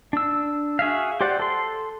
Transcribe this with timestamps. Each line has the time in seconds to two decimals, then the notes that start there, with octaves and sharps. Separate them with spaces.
0.13 D4 E6
0.79 F#4 G#4 E5 F5
1.21 G4 C5 D5 F#5
1.40 A4 C6